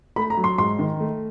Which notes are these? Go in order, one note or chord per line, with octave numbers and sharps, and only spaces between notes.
A3 B5
A#5
F#3
C6
G#2 C6
D#3
A3